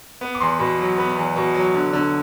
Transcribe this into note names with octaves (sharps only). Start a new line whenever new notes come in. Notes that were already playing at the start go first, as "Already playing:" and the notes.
B3
D6
E2 C6
B2 B5
F#3
B3 B5
E2
B2
F#3
D3
D3